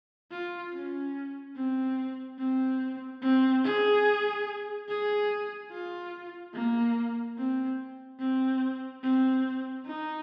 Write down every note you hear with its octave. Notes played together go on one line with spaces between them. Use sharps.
F4
C#4
C4
C4
C4
G#4
G#4
F4
A#3
C4
C4
C4
D#4